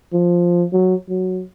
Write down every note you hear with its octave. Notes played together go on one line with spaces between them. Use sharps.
F3
F#3
F#3